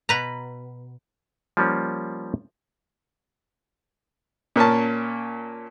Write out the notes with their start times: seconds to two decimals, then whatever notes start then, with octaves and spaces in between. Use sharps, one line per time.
0.09 B2 B4 A#5
1.57 F3 G3 A#3 C#4
4.56 A#2 A#3 C#4 A5